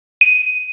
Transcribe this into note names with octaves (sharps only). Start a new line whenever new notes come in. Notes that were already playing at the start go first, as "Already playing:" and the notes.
D#7